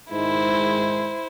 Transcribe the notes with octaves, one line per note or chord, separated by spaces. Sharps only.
G#2 D#3 G#3 E4 C5